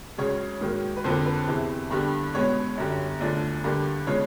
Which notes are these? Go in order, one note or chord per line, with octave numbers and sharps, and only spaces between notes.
C#2 C#3 F#3 C#5
G#2 D#3 F#3 A#3
B4
F2 D3 F3 A#3 C5
B4
E2 C3 E3
G2 D3 G3 B3
C#2 B2 G#3 B3 C#5
F#2 D3 G3
D2 D3 F3 D5
G2 D3 G3 A#3
C#3 F3 G#3 B3 C#5